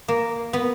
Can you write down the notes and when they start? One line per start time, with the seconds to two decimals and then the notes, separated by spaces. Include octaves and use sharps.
0.08 A#3
0.53 B3